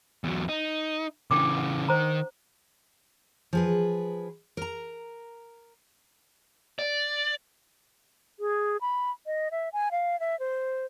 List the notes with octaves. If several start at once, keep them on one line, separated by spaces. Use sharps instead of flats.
E2 F#3
D#4
C#3 E3 D4 G5 D6
F#5
D#3 C5 A#5
F3 G#4 B4
A#4 A#5
D5
G#4
B5
D#5
E5
G#5
F5
E5
C5